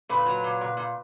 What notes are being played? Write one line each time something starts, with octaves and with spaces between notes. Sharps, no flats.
A#2 B4
F#3
A#2
A#2
A#2